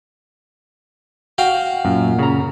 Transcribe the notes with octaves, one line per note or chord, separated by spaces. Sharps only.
F#4 F5 G5
F#2 A#2
C#3 A#5